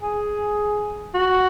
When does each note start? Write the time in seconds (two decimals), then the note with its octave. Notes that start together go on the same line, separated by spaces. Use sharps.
0.02 G#4
1.14 F#4